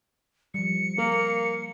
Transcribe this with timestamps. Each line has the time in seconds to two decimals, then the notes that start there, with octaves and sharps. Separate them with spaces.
0.54 F3 G3 C#7
0.98 A#3 A#4